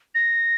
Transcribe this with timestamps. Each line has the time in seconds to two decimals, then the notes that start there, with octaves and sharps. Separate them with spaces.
0.15 A#6